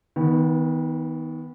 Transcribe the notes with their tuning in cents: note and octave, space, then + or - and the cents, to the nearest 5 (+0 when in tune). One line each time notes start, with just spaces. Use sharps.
D#3 +35 B3 +0